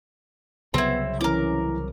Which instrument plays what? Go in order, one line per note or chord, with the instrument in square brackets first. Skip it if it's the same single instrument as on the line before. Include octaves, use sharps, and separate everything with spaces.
[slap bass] C2 C#3 F#3 [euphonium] B3 [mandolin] C4 E4 [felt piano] C6
[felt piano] E3 [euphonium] C#4 [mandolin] A#4 D6